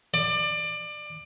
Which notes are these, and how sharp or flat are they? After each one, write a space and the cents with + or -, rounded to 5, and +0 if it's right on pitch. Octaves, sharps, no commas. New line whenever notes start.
D5 +25